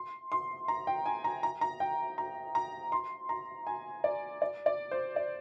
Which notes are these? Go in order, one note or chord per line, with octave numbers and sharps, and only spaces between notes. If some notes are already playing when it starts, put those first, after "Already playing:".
Already playing: C6
C6
A#5
G5
G#5
A#5
A#5
A#5
G5
A#5
A#5
C6
A#5
G#5
D5
D5
D5
C5
D5